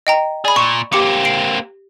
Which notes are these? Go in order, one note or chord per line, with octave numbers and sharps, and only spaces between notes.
D#5 G5 A#5
G#4 D5 B5
A#2 C#6
A#3 C4 G4 D6 C#7
C7 D7